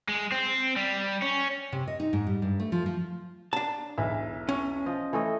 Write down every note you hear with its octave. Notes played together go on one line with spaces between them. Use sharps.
G#3
C4
G3
C#4
C3
D#5
D#4
G#2
G3
G2
A3
F3
F3
D4 A5
E1 B1 E3 E5
C#4
F3 D#5
E3 A3 D#5